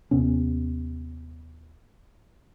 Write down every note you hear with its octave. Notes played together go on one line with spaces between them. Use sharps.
D#2 C3 B3 C#4